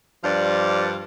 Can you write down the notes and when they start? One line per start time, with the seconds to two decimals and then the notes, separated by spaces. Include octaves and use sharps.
0.24 G2 F3 D4 D5 F5